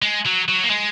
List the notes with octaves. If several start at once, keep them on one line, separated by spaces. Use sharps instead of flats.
G#3
F#3
F#3
A#3
G#3